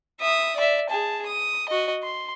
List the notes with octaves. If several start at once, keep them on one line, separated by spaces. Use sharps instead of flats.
E5 D#6
D5 E5
G#4 A5
D#6
F#4 D#5
C6